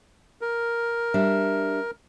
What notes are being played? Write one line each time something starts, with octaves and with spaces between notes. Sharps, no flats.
A#4
G3 D4 E5